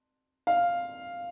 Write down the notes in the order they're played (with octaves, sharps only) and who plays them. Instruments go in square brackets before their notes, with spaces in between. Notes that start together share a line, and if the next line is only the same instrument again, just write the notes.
[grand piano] F5